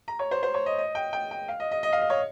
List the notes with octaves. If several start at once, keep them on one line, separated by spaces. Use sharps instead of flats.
A#5
C#5
C5
C5
C#5
D#5
D#5
G5
G5
G5
F5
D#5
D#5
D#5
F5
D#5
C#5